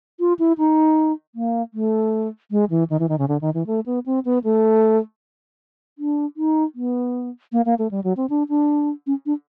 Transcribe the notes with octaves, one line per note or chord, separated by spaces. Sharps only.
F4
E4
D#4
A#3
A3
G#3
E3
D#3
E3
D#3
C#3
D3
D#3
E3
A3
B3
C4
B3
A3
D4
D#4
B3
A#3
A#3
A3
G3
F#3
C4
D4
D4
C#4
D4